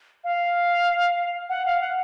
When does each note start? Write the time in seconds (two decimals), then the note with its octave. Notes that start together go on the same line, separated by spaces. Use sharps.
0.24 F5
1.49 F#5
1.66 F5
1.81 F#5